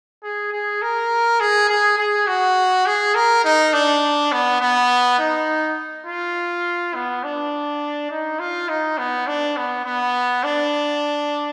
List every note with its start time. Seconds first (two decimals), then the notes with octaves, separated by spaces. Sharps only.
0.24 G#4
0.52 G#4
0.82 A#4
1.40 G#4
1.69 G#4
1.98 G#4
2.27 F#4
2.86 G#4
3.15 A#4
3.44 D#4
3.73 D4
4.32 B3
4.61 B3
5.19 D#4
6.06 F4
6.94 B3
7.24 D4
8.11 D#4
8.39 F4
8.69 D#4
8.98 B3
9.27 D4
9.57 B3
9.85 B3
10.44 D4